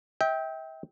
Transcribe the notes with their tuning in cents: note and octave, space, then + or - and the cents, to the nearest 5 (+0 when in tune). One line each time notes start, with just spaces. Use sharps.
E5 -40 G5 +0